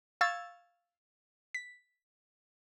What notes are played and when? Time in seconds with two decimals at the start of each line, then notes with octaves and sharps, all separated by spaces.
0.21 F5 C#6 E6 G#6 A6
1.54 B6